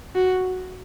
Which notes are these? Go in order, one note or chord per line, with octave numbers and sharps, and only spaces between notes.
F#4